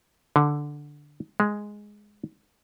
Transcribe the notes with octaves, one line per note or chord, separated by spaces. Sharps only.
D3
G#3